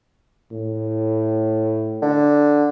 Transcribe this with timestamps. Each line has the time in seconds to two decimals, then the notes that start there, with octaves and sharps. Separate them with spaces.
0.52 A2
2.02 D3